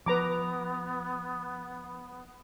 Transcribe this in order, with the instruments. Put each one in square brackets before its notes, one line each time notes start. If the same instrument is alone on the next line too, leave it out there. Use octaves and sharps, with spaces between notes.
[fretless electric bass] F3 [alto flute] B3 [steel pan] B4 A#5 D6